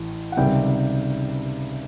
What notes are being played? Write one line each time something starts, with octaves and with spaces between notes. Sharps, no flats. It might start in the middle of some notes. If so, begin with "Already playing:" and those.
Already playing: A1 A2
F#5
C#2 C3 D#3 G3 G5